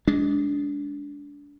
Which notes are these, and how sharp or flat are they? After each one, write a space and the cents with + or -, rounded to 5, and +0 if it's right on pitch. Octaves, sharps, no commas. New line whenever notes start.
G#3 +0 D4 -25